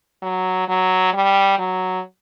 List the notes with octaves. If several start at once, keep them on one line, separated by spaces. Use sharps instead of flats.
F#3
F#3
G3
F#3